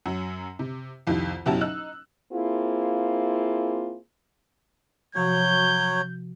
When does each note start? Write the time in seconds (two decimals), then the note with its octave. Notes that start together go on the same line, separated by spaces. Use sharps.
0.06 F#2 F#3
0.59 C3
1.07 C2 F2 D#3 G3
1.46 F#1 B2 F#3 E4 G4 A5
1.61 D#4 E6 F#6
2.32 A#3 C4 E4 F4 G#4
5.15 C3 F3 F#3 F#4 C#5 G6